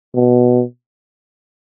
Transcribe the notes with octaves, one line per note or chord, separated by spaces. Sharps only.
B2